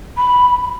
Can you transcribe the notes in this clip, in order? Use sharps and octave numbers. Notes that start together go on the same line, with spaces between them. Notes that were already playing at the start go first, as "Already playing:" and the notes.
B5